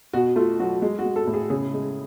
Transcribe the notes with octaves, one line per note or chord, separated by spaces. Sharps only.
B2 F#4
A3 F4
F#3 F#4
G#3
F#4
G#3
A4
A2
G#4
C#3 G#4
G#3